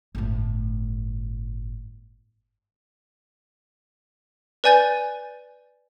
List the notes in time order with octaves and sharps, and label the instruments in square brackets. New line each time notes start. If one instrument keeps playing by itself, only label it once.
[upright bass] G1 A2
[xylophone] B4 D5 G#5 G6 A6